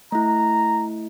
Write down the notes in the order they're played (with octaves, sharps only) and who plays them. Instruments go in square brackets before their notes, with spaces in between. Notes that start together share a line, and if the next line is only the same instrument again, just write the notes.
[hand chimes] A3 E4 [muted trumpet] A#5